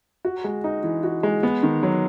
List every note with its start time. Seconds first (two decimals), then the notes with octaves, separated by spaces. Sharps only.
0.25 F#4
0.44 G#3
0.64 D#4
0.84 E3
1.03 F#4
1.23 G#3
1.43 B3
1.63 D#3
1.83 F#3